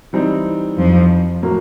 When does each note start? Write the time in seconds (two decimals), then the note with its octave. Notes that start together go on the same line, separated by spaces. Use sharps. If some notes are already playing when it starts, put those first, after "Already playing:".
0.13 E3 G3 C4 D#4
0.77 F2 F3
1.42 A2 F#3 A#3